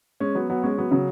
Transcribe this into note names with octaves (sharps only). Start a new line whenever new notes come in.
G#3 C#4
F#3 B3
F#3 B3
G#3 C#4
F#3 B3
C#3 F#3